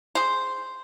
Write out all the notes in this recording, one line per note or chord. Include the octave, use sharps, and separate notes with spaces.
G#4 C5